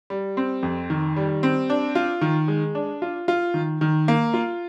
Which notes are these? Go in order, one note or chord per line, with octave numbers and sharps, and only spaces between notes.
G3
C4
F2
D#3
G3
C4
D4
F4
D#3
G#3
D4
F4
F4
D#3
D#3
A#3
F4